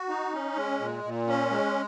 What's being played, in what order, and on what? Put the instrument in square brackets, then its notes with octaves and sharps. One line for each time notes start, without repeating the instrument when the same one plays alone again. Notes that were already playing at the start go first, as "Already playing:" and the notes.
Already playing: [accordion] F#4
D#4
C#4
G#3
A#2
A#2
C#4
G#3